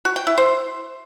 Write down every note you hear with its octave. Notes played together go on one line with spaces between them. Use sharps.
F#4
G5
E4
C5